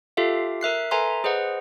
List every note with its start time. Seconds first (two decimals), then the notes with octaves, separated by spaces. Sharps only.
0.17 F4 G4 A4 E5 F5
0.61 A#4 E5 F#6 C7
0.91 A4 B4 E5 G#5 A#5 C6
1.24 G#4 B4 C5 D#5 F#5